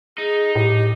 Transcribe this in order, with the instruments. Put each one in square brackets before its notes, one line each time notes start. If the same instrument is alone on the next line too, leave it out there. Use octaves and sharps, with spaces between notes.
[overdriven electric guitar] D#4 [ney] G#4
[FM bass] A2 [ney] G4